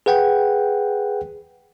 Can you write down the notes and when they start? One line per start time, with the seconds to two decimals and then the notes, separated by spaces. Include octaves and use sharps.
0.06 G#4 B4 F#5 G5